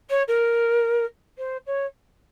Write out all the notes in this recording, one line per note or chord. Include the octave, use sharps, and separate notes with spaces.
C#5
A#4
C5
C#5